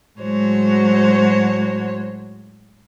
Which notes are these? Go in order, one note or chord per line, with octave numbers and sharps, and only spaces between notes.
A2 F#3 G#3 F#4 C5 C#5